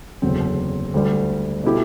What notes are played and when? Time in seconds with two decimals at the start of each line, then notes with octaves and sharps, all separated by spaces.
0.22 F#1 E2 D3 F#3 C4
0.94 D2 D3 G3
1.64 B2 A3 E4 G4